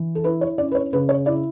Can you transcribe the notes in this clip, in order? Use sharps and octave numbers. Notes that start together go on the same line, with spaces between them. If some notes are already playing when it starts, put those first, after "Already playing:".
Already playing: E3
A4
E4 B4
C#5
C#4 D5
B4
C#5
C#3 B4
C#5
E4 D5